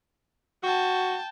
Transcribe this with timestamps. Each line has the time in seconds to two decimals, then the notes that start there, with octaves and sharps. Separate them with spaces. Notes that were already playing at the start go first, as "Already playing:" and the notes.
0.63 F#4 G5 A5